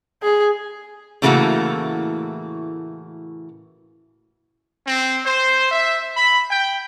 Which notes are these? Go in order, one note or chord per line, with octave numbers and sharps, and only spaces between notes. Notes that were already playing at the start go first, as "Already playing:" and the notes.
G#4
A2 C#3 E3 A3 A#3 F#4
C4
C5
E5
B5
G5